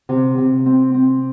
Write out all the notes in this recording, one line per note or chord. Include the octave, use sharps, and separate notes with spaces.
C3
C3
C4
C4